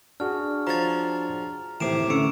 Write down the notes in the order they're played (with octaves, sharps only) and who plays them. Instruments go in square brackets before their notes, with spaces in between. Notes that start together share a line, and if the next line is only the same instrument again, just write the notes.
[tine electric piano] D4 F#4 G#4 [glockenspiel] F6
[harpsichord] F3 C#5 [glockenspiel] A#5 A6
[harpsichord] A2 C3 [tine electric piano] D#3 E3 C7 [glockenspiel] D6 D7 E7
[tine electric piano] D3 A3 [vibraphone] C#4 [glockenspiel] E6 C#7 D7